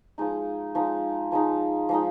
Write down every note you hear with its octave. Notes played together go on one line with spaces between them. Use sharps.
F3 G#3 D#4
F3 G#3 D#4
F3 G#3 D#4
F3 G#3 D#4